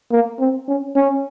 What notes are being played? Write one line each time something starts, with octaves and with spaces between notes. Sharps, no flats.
A#3
C4
C#4
C#4